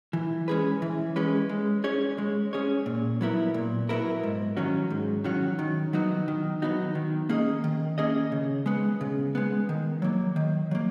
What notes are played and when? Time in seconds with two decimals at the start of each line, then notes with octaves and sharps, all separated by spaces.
0.13 E3
0.48 G#3 C#4 G#4 B4
0.82 E3
1.16 G#3 C#4 G#4 B4
1.49 G#3
1.84 C#4 G#4 C#5
2.18 G#3
2.53 C#4 G#4 C#5
2.86 A#2
3.21 F#3 B3 E4 A#4
3.54 A#2
3.89 F#3 B3 E4 A#4
4.23 G#2
4.57 D#3 F#3 C#4 F#4
4.90 G#2
5.24 D#3 F#3 C#4 F#4
5.59 D#3
5.93 F#3 B3 D#4 F#4
6.28 D#3
6.62 F#3 B3 D#4 F#4
6.95 D#3
7.29 A#3 C#4 G#4 D#5
7.64 D#3
7.98 A#3 C#4 G#4 D#5
8.32 C#3
8.66 G#3 B3
9.01 C#3
9.35 G#3 B3
9.69 D#3
10.02 F#3 A#3
10.36 D#3
10.71 F#3 A#3